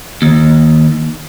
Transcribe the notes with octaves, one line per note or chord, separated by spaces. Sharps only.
D#2